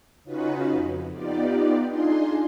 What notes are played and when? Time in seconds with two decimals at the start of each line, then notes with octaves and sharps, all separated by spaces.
0.24 C#3 C#4 D#4 F4 F#4 B4
0.71 F2
1.13 B3 D#4 F4 G4 D5
1.86 D4 D#4 F4 G#4 C6